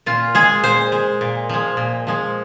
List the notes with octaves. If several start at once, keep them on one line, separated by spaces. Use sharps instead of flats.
A#2 F4
G#3 G#4
A#2 C5
G#3
A#2
F3 G#3
A#2
F3 G#3